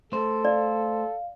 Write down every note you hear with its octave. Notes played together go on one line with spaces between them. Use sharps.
A3 A4 C5
D5 F5